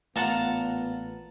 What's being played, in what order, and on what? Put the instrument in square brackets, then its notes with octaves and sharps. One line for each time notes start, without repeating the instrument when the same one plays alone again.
[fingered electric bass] A1 A3 [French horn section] A#2 B3 [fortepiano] F4 [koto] F#5 A5 A#5